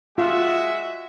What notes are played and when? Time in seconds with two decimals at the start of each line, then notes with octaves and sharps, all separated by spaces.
0.18 G#3 F4 F#4 E5